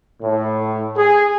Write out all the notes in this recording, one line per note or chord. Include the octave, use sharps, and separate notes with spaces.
A2
G#4